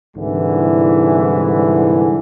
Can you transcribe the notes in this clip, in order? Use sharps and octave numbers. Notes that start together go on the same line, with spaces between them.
C2 G#2 D3 E3